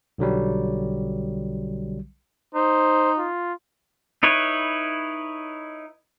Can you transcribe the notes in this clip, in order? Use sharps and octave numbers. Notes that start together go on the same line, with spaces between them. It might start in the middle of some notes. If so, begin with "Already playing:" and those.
B1 D3 F#3 G3
D#4 C5
F4
D#4 E4 B4 C#5